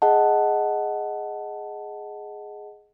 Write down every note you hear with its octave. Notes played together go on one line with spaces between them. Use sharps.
G#4 D#5 F#5 A5